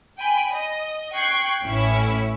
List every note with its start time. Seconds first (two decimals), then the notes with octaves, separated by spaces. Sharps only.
0.18 G5 G#5 B5
0.52 D#5
1.13 G5 C#6 F#6 G#6 C7 C#7
1.64 A1 A2 C#4 E4 C#6